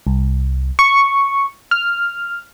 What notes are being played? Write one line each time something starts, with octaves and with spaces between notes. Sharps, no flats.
C2
C#6
F6